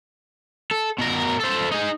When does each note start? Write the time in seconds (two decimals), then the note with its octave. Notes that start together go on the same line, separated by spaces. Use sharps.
0.71 A4
0.98 B2 A#4
1.40 A4 C5
1.72 D#4 G#4